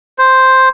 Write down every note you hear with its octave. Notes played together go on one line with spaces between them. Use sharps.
C5